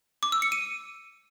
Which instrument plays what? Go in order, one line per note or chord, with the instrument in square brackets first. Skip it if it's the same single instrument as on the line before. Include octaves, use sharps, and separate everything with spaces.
[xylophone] D6
E6
C#7
D#7